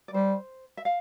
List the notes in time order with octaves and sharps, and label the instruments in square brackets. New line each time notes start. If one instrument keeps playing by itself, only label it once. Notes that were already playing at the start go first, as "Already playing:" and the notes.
[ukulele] D5
[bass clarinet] G3 [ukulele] C5
[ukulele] E5
F5